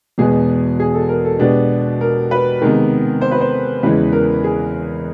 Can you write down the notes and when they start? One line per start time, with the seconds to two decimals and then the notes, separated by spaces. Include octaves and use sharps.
0.18 E2 B2 G#3 B3 G#4
0.80 G#4
0.95 A4
1.09 A#4
1.25 A4
1.39 B2 G#3 B3 D4 G4
2.01 A#4
2.31 B4
2.61 C3 D#3 G#3 B3
3.21 C5
3.31 B4
3.41 C5
3.83 E2 C#3 E3 G#3 B4
4.12 A#4
4.44 G#4